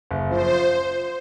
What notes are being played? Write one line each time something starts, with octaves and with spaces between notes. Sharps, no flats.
F#1
F3 C5